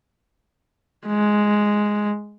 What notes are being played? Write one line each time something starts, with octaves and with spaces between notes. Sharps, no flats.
G#3